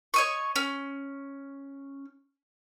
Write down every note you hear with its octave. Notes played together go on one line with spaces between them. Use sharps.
C#5 D#5 C#6
C#4